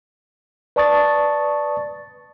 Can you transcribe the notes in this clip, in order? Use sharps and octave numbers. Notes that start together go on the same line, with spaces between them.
B4 D5 A5 C#6 D#6 A6